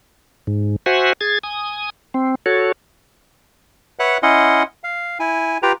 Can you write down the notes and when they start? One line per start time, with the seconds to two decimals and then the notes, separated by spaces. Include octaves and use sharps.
0.47 G#2
0.86 F#4 C5 E5 F#5 G#5
1.21 G#4 G#6 A6
1.43 G#5 D#6
2.14 C4
2.46 F#4 A4 C#5
3.99 B4 C#5 E5 F#5 F#6
4.23 C#4 E4 D#5 F#5 C6
4.84 F5
5.20 E4 G#5
5.63 F4 G4 B4 G5 A#5